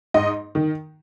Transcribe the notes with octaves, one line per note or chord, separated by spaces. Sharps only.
G#2 D#5
D#3